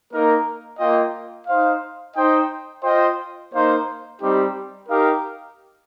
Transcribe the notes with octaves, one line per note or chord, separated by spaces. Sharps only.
A#3 D#4 A#4
A#3 F4 D#5 G5
D#4 C5 F5
D#4 C5 D#5 G5
F4 C5 D#5 G5
A#3 D#4 C5 F5
G3 C4 D#4 G4
D#4 G4 A#4 F5